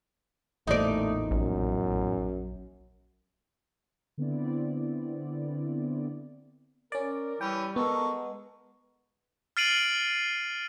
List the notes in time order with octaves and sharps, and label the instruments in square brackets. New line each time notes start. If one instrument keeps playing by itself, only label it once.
[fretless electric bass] A1 E2 A#2 [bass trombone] A3 [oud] D#4 D5
[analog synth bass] A#1 [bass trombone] F#2
[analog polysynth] D3 B3 C4 E4 D5
[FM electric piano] C#4 D5 [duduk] A#4
[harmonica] E3 C#4 [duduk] G3 [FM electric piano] G5
[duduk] G#3 [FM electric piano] B3 [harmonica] A4 A#4 C#6
[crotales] F6 A6 C7 D7 D#7 F#7